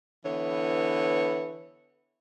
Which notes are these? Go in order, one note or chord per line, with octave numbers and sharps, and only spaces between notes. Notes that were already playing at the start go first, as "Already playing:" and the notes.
D3 E3 B3 B4 C#5